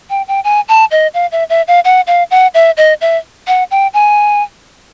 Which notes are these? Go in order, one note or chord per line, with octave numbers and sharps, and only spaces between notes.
G5
G5
G#5
A5
D#5
F5
E5
E5
F5
F#5
F5
F#5
E5
D#5
E5
F#5
G5
G#5